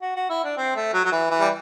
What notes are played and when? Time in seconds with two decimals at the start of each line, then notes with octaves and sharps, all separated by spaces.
0.02 F#4
0.16 F#4
0.29 E4
0.43 D4
0.57 C4
0.76 A3
0.93 F#3
1.05 F#3
1.12 E3
1.30 E3
1.40 G3